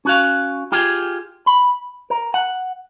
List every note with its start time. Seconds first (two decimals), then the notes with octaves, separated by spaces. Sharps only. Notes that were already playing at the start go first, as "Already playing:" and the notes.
0.05 C#4 F#4 F5
0.72 F4 G4 G#4
1.46 B5
2.10 A#4
2.34 F#5